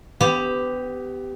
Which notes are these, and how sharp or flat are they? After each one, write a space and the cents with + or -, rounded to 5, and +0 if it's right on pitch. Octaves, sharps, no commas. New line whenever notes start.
B3 +30 G4 +0